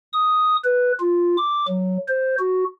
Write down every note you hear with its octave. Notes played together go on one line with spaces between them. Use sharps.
D#6
B4
F4
D6
F#3
C5
F#4